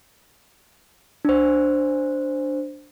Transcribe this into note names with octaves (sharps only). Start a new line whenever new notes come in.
D4 C5